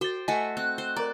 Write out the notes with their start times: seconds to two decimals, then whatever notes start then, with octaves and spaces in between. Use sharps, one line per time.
0.01 F#4 C5 G5 A6
0.28 A3 F#4 D#5 G#5
0.57 C4 F#6
0.78 C5
0.96 A#4 D5 A#5